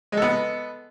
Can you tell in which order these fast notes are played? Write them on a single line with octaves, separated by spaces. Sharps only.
G#3 A4 B3